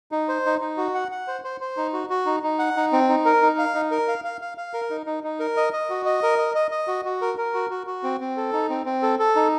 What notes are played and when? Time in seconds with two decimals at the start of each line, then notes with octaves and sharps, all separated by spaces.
0.12 D#4
0.28 C5
0.46 D#4
0.61 D#4
0.77 F#4
0.94 F#5
1.12 F#5
1.28 C5
1.44 C5
1.61 C5
1.77 D#4
1.93 F#4
2.10 F#4
2.26 D#4
2.43 D#4
2.59 F#5
2.77 D#4
2.92 C4
3.09 D#4
3.25 A#4
3.42 D#4
3.58 F5
3.75 D#4
3.91 A#4
4.08 F5
4.24 F5
4.41 F5
4.58 F5
4.74 A#4
4.90 D#4
5.06 D#4
5.24 D#4
5.39 A#4
5.57 D#5
5.73 D#5
5.90 F#4
6.06 D#5
6.23 A#4
6.39 D#5
6.55 D#5
6.71 D#5
6.88 F#4
7.05 F#4
7.22 A#4
7.38 A#4
7.54 F#4
7.70 F#4
7.87 F#4
8.04 C4
8.20 C4
8.37 A4
8.53 D#4
8.70 C4
8.86 C4
9.03 A4
9.19 A4
9.36 D#4